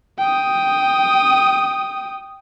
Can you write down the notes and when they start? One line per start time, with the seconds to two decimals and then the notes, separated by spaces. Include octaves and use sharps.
0.19 G5 D#6